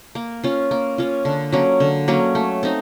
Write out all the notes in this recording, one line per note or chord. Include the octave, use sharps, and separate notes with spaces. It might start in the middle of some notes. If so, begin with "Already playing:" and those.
A#3
C#4 F4
A#3
C#4 F4
D3
F#3 A#3 C#4
D3
F#3 A#3 C#4
A3
C4 D#4